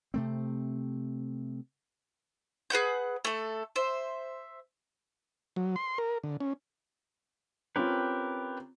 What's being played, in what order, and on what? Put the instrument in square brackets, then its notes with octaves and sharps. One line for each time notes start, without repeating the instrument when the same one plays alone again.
[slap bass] C3 A3 C4
[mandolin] G#4 B4 F#5 G6
A3 A4
C5 E5
[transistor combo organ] F#3
C6
A#4
D3
C#4
[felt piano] C4 C#4 F4 [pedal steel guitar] G4 A#4 B4